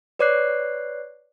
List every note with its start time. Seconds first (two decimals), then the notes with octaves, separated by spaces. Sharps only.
0.19 B4 C#5 D5 D6 F#6 C7